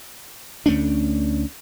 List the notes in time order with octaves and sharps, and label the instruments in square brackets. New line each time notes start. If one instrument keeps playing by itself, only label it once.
[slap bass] D2 A3 C#4 D4